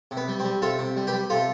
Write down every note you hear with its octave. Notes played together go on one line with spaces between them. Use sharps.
C3
B3
G3
C4
G3
C3 F4 A4
C3
G3
G4 B4
G3
C3 F4 A4